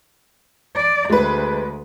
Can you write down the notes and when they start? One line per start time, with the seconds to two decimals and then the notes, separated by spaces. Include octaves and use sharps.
0.75 D5
1.10 D2 G#3 B4